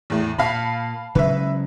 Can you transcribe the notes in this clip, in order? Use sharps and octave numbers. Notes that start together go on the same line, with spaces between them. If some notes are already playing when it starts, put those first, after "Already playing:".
E2 A2
A#2 F5 A5 B5
C#3 F#3 G#3 B4 E5